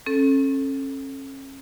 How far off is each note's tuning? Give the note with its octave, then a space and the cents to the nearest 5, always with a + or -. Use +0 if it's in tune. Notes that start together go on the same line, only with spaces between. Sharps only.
C#4 -35 A4 +0